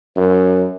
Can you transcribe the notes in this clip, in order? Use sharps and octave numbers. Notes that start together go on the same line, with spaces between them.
F#2